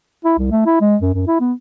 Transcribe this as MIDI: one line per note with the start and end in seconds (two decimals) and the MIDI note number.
0.25 0.34 64
0.38 0.48 36
0.51 0.64 57
0.66 0.80 64
0.81 0.96 56
1.01 1.12 42
1.14 1.26 42
1.28 1.39 64
1.40 1.53 59